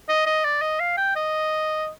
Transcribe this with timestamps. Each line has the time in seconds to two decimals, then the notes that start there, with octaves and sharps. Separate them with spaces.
0.09 D#5
0.26 D#5
0.45 D5
0.62 D#5
0.80 F5
0.97 G5
1.16 D#5